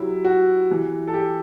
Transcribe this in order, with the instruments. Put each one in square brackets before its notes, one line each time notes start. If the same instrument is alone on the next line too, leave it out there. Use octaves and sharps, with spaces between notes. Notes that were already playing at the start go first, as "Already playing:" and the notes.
Already playing: [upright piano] C3 F#3 E4
F#4
C3 E3
A4
G4